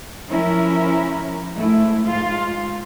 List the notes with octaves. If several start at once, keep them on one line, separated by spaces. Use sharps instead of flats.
F3 C#4 E4 A#4
G#2 A3 E4
G#2 F4